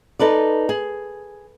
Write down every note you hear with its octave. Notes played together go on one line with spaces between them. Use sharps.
D#4 A4 B4 D5
G#4